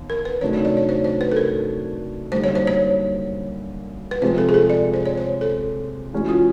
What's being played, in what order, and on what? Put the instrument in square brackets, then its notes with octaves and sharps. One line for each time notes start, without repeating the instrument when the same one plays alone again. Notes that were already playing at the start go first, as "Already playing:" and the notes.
Already playing: [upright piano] D#2 B3
[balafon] A#4
B4
[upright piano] C3 D#3 F#3 A3 D4 [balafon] C#5
[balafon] C#5
D5
C#5
C5
C5
B4
A4
A#4
[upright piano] F#2 D3 G3 A#3 D#4 [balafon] C5
[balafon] C#5
C5
C#5
B4
[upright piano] C3 F3 G#3 C4 [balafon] C5
[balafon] A4
G#4
A4
D5
C5
C#5
C5
A4
[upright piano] E3 G#3 C#4 F#4
[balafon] F4